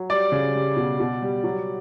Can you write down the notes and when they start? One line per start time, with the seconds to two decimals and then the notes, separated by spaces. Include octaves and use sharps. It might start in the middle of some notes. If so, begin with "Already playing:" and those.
Already playing: F#3
0.10 G3 D5
0.32 C#3
0.55 G3
0.76 B2
1.00 B2
1.22 G3
1.44 F#3